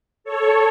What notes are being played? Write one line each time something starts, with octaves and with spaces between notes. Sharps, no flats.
A4 C#5